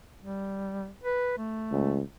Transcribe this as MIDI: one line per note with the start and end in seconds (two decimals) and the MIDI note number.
0.22 0.89 55
1.04 1.37 71
1.38 2.01 57
1.72 2.01 37